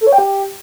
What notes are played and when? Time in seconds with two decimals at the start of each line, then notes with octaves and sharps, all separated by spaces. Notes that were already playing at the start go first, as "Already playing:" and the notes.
0.01 A4
0.07 C#5
0.13 G5
0.18 G4